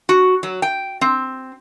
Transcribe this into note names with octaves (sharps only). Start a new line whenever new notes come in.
F#4
F#3
G5
C4